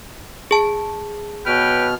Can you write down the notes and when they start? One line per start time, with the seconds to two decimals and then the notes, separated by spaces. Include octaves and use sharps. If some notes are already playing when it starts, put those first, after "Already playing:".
0.51 G#4 A5
1.46 B2 B4 C#5 G5 F6